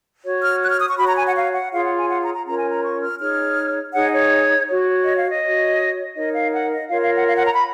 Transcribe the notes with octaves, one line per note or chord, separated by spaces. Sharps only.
F#4 C#5
F6
F#6
F6
D#6
C#6
F#4 C#5 B5
A#5
G#5
F#5
F5
F#5
F4 G#4 C#5 F5
F#5
G#5
F#5
A#5
A#5
C#4 F4 A#4 C#5 A#5
G#5
A#5
C#6
F6
D#4 G#4 C#5 F6
D#4 G#4 C#5 F#5
C#5
F#4 C#5
D#5
F5
D#5
F#4 C#5
D#4 A#4 C#5 D#5
F5
F#5
D#5
F4 A#4 C#5 F5
F5
F#5
F5
F#5
A#5
B5